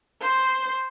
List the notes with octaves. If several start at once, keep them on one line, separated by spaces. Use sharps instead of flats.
C5